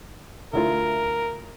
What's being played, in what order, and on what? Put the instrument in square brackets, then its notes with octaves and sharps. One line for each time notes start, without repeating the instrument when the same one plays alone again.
[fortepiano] D2 E4 F4 [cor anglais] A#4